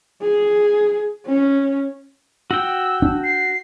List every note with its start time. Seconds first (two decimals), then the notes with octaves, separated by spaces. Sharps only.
0.22 G#4
1.26 C#4
2.51 F#4 G5 E6
3.02 D4
3.24 C7